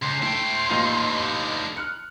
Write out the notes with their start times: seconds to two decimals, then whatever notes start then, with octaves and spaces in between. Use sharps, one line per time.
0.03 C#2 C6
0.22 A3 E4 G5
0.69 A1 D3 A#3 D#4 F4
1.77 F6 F#6 C#7